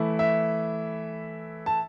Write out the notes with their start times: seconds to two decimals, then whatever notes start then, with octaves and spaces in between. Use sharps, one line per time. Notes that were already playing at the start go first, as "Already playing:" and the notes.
Already playing: E3 A3 E4
0.19 E5
1.66 A5